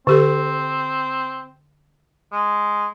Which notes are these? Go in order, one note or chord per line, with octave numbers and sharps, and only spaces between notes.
D3 C4 G4 A4
G#3